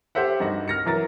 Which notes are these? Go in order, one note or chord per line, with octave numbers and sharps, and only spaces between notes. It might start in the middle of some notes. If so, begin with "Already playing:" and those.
G4 A4 C5 E5 F#5
G2 D#4 F#4 F#5
F6 A#6 C#7
E3 F#3 A#4 A6